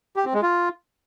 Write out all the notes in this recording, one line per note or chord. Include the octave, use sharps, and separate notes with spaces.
G4
C4
G#3
F4